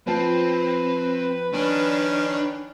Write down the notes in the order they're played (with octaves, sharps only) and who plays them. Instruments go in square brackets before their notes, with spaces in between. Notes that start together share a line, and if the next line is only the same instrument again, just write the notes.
[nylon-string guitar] F3 A5 [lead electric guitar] C4 [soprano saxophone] B4
[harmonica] D#3 C#4 [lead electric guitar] D4